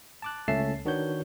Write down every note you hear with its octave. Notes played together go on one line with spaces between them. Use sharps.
A5 D6 F#6
C#2 A3 C#4 E5 A5 C7
D#3 D4 F#4 B4 C#5 G6